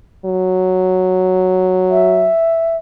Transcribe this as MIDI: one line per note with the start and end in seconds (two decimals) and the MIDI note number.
0.25 2.30 54
1.91 2.77 76